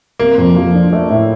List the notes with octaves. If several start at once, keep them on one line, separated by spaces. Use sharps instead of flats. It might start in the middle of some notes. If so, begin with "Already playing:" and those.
C3 A#3
F2
F3
D4
A3
A2